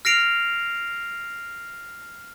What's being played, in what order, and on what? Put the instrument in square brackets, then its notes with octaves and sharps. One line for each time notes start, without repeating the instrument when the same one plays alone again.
[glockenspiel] F6 A#6 C7 D7 F7